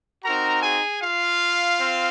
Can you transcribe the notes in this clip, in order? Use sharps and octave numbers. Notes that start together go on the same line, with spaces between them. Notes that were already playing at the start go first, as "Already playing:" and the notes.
C4 D#4 F#4 A#4 A#5
G#4 G#5
F4 F5
C4